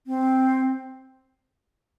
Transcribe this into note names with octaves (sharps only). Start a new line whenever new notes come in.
C4